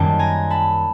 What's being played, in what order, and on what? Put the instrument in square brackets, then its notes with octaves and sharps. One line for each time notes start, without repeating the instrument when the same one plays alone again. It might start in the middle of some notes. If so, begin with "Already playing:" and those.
Already playing: [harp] F#2 D#3 G3 A#3 G5 A5
G#5 A#5
A5 B5